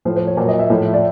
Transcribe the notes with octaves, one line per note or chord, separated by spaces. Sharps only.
A2 F3 C5
C5
C#5
A#2 F#3
D#5
E5
A2 F3
D5